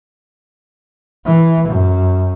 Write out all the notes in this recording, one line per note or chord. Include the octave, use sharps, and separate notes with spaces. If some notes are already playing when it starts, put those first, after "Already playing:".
E3
F#2